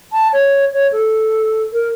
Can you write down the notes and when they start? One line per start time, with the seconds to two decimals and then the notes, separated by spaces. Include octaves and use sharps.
0.13 A5
0.33 C#5
0.74 C#5
0.92 A4
1.73 A#4